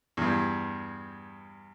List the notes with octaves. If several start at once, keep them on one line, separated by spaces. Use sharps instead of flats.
E2 G2